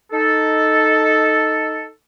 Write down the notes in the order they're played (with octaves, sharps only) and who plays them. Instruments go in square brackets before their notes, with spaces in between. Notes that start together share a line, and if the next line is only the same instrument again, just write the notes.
[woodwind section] D#4 A4